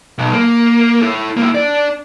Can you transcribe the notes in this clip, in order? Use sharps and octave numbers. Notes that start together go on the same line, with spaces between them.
B1
A#3
E4 A4
A#3 E4
D4 D5